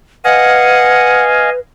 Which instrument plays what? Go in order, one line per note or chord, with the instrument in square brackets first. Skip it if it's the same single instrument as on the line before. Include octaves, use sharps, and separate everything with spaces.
[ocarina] B4 [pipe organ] D#5 F5 G#5 [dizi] F#5